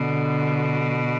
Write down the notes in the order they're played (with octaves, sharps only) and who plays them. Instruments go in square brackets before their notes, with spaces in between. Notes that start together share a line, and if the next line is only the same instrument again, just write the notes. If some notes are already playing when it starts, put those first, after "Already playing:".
Already playing: [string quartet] B2 [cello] D3